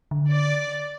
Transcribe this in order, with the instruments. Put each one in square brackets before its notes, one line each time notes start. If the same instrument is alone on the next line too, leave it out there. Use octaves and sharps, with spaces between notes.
[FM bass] D3
[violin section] D5